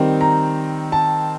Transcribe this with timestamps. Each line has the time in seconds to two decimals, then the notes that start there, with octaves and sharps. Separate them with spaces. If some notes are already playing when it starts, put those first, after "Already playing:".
Already playing: D#3 G3 C4
0.21 A#5
0.92 A5